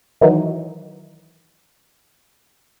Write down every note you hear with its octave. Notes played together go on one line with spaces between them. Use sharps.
D#3 E3 F#3 D#4